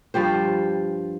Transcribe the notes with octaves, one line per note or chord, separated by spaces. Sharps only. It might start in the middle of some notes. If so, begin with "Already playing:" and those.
G2 F3 G4 C5